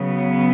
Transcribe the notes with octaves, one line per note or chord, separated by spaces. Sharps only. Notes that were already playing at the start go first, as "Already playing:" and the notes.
Already playing: C#3 F#3 B3